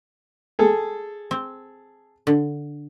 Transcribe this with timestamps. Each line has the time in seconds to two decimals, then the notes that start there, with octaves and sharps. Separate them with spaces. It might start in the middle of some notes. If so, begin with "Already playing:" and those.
0.59 G#4 A4
1.31 C4
2.27 D3